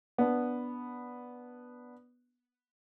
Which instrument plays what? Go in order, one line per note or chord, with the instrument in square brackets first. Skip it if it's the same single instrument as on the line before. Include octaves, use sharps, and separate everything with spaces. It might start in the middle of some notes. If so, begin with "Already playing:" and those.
[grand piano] B3 D4